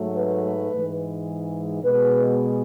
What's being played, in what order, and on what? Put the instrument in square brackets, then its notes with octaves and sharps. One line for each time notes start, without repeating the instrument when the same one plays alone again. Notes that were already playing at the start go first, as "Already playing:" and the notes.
Already playing: [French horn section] G#2 F#3 A3
B4
G#2 E3 G#3
B2 G#3 B4